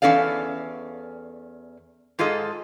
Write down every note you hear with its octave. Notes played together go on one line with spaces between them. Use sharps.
E2 C#4 A4 D5 F5
G#2 F4 G#4 A4 D#5